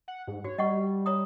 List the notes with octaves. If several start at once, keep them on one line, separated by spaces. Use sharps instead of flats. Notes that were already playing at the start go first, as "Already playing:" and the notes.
F#5
G#2
F#4 C#5
G3 D#5 F#5 C#6
C#5 A#5 D#6